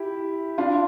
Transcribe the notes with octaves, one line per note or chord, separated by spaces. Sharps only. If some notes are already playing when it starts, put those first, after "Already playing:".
Already playing: E4 G4
D4 F4